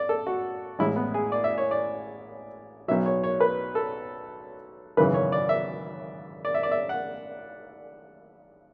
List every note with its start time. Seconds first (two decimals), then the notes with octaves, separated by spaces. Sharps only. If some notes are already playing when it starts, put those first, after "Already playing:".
Already playing: D5
0.09 A4
0.27 F#4
0.79 A1 A2 G#3 E4
0.96 B3
1.14 G#4
1.32 D5
1.44 E5
1.58 C#5
1.71 D5
2.88 B1 B2 F#3 E5
3.06 C#5
3.24 C#5
3.40 B4
3.75 A4
4.97 G#1 F#2 C#3 E3 B4
5.14 C#5
5.32 D5
5.49 E5
6.45 D5
6.54 E5
6.63 D5
6.72 E5
6.89 F#5